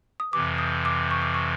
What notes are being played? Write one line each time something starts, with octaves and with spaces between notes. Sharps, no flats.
D#6
F2 C3 E3 D6
D#6
D6
C#6
D6
C#6